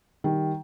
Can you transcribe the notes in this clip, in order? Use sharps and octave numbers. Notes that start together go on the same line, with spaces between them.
D#3 G3